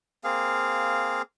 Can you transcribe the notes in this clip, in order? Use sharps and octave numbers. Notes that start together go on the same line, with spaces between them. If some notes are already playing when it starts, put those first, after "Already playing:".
A#3 C4 G#4 F5